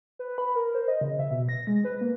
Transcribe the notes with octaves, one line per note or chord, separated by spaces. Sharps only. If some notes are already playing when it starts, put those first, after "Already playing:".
B4
B5
A#4
C5
D#5
C#3
E5
B2
A#6
G#3
B4
A#3